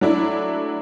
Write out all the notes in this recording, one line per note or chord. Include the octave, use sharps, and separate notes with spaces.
F#3 A3 D4 E4